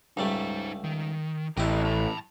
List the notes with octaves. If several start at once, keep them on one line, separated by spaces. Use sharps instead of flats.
C#2 G3 A3 D#4 C5
D#3
A1 C4 E4 G4 D#5
A5 B5